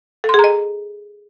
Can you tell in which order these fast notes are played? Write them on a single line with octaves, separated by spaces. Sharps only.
A4 C6 G#4 A#5 D#5